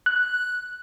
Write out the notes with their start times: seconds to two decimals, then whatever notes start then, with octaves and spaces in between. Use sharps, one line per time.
0.06 F#6